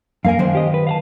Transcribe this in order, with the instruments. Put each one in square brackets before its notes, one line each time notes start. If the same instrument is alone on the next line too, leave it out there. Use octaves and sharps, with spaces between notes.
[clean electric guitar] F#2 A#3 G#5 [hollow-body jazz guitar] A#4 F5
[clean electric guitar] F#2 [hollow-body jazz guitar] D#3 C5
[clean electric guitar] G4 D#5
B4
F5 F#5 A5